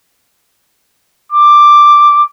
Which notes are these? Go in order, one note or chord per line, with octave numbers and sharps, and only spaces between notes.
D6